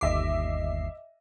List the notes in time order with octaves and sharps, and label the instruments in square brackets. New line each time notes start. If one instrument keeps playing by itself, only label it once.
[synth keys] G1 D#2 C7 [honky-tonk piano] D#5 E5 D6